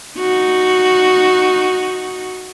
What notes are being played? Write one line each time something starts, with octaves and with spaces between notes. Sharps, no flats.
D#4 F#4